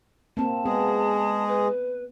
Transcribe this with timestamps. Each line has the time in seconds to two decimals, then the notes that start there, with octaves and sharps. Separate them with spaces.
0.37 A#3 C4 A5
0.65 G#3 B3 G#4
1.47 B4